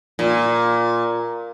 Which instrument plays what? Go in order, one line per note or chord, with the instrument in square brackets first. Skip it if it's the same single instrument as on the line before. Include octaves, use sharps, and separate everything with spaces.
[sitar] A#2